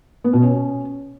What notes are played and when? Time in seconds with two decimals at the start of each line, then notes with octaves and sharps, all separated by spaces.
0.24 B3
0.33 B2
0.42 C#4